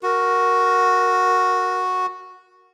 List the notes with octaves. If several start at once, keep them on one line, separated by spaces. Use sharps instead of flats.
F#4 A#4